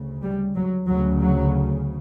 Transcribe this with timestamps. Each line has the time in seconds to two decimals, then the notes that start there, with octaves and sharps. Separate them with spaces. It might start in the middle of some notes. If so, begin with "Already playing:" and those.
Already playing: D2 C#3
0.23 G3
0.55 F#3
0.87 D2 C#3 F#3
1.20 F#3